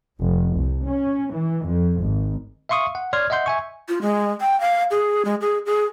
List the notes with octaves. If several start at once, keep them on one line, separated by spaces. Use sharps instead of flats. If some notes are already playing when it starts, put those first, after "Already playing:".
F1
C2
C#4
E3
F2
G#1
E5 F5 C6 C#6 D#6
F#5
C#5 D5 C6 F6 G#6
D#5 E5 F#5 C6 G6
E5 G#5 C#6
F4
G#3
G5
F5
G#4
G#3
G#4
G#4